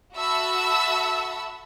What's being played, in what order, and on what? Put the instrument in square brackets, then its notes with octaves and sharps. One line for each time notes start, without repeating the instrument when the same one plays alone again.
[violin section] F#4 A4 E5 A5 B5 E6